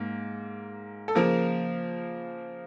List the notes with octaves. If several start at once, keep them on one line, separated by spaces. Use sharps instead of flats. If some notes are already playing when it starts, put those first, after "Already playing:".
Already playing: G#2 A#3
A4
C#3 F3 A#3 A#4